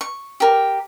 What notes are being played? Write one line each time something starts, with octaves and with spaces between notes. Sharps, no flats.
C#6
G4 A#4